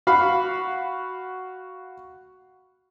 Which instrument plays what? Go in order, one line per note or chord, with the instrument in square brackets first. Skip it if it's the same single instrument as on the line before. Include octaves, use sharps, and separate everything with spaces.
[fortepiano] F#4 F5 B5